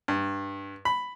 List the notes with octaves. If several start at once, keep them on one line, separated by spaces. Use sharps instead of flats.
G2
B5